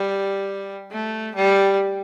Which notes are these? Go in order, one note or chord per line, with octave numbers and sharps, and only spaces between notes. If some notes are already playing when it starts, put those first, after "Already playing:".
Already playing: G3
A3
G3